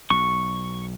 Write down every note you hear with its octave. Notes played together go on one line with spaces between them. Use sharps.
B1 C#6